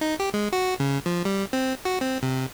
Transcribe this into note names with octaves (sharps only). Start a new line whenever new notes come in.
D#4
G4
G#3
F#4
C#3
F3
G3
C4
F#4
C4
C3